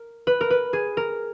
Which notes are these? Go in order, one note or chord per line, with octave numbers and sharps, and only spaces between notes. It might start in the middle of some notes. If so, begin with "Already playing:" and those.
Already playing: A#4
B4
A#4
B4
G#4
A#4